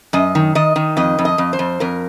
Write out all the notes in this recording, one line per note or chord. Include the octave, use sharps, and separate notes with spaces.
F#2 D#5
D#3
D#3 D#5
D#3
F2 D#5
F2
D#5
F2
C5
F2
F2 A#4